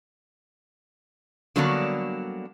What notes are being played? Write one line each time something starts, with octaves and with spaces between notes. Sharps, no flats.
D3 F#3 G3 A#3 B3 D4